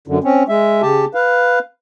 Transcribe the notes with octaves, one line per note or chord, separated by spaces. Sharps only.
F#2 D3
C4 C#4
G#3 E5
C#3 G4 A5
B4 F5